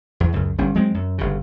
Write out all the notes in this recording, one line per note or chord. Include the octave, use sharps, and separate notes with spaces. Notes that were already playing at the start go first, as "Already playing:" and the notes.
E2
C#2 F#2
G1 G3 C#4
F#3 G#3 C4
F#2
G1 C#3